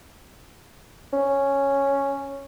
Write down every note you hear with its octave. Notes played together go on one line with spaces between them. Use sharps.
C#4